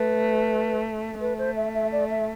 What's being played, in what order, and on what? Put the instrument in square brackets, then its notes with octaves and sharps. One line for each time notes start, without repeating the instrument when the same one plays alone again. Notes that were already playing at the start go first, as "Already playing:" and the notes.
Already playing: [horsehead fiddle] A3 [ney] B4
[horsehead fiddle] A3 [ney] B4
[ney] C5
E5
E5
D5
E5